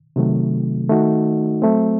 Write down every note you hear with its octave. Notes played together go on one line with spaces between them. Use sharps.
C3 D#3 F#3 A3
D#3 A3 D#4 F#4
F#3 A3 C4